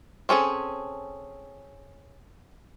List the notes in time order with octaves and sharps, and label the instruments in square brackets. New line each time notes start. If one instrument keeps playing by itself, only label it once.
[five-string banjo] C4 C#4 G#4 A4